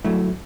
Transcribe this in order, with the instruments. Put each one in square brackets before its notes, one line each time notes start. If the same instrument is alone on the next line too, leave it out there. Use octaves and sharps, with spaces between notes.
[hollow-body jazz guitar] G2 F#3 A3 E4